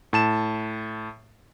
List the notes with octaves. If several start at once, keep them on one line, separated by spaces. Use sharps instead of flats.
A2 A5 E7